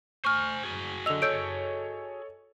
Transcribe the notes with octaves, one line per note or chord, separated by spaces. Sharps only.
C5 G#5 C#6 F6
F#4 G#4
D3 D#5 E6 F7
A4 C#5 D#5 E6 G6 D7